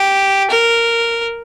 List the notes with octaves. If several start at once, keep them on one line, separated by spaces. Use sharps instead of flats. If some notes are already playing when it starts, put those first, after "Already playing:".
Already playing: G4
A#4